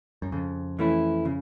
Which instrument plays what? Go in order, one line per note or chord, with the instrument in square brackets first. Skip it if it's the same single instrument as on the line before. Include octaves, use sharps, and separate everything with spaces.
[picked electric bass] F#2
[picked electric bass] F2 [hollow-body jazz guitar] C#3
[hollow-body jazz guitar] E3 A3 C#4 E4
C#3